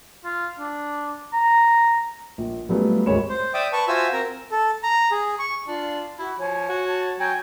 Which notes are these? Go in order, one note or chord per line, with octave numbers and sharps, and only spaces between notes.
F4
D4
A#5
A#1
F#3 G3 A3 B3 C#4 F4
G#1 D2 G#3 C#5 B5 E7
C5
D5 E5 G5 D6 D#6
B4 A5 C#6
F4 F#4 C5 E5 G#5 E6
C4 A#4 A#5
A4
A#5
G#4
C#6
D4 F4
E4 F#4
F3 C#5 G#5
F#4
A5
F#3 G5 G#5